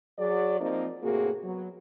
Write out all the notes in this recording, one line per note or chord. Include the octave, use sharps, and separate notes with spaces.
F#3 G#4 D5
F3 A#3 C4 D#4
A2 C3 A#3 F#4 G#4
F#3 B3